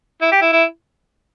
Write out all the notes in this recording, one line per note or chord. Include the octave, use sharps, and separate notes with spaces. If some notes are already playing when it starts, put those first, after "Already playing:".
E4
G4
E4
E4